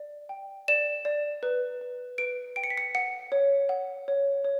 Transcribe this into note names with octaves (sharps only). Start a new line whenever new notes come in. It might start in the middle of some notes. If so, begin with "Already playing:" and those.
Already playing: D5
G5
D5 E7
D5
B4
B4
B4 D7
G5 D7
C#7
B6
C#7
F#5 C#7
C#5
F#5
C#5
C#5